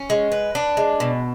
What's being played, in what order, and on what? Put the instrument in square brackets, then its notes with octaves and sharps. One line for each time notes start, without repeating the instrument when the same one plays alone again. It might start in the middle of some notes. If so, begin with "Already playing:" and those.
Already playing: [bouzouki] C#4
G#3
B4
D4
G#3
B2